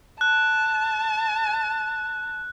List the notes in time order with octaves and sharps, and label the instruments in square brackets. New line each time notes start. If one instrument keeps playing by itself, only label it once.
[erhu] A5 [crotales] F#6